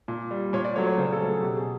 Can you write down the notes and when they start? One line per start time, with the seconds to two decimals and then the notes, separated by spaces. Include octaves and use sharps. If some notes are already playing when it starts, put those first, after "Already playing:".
0.08 A#2
0.31 G3
0.53 A#2 C#5
0.64 D5
0.76 F#3 A3 C#5
0.86 C#5
0.98 C#3 C5
1.13 A4
1.20 F#3 A3
1.28 G#4
1.42 B2 G4
1.57 G#4